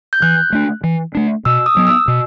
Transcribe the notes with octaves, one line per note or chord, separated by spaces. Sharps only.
G6
E3 F#6
A3 D4
E3
A3 D4
B2 E6
D#6
F#3 B3
E6
B2